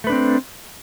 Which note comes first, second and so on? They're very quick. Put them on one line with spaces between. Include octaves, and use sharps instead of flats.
A3 B4 D4 C4